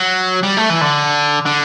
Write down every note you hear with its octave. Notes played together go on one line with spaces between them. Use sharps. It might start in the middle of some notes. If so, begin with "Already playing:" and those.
Already playing: F#3
G3
A3
E3
D3
D3